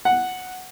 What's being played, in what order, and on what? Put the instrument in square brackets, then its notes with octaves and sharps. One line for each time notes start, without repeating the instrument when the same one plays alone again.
[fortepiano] F#5